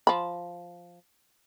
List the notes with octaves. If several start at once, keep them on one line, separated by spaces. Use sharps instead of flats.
F3 B5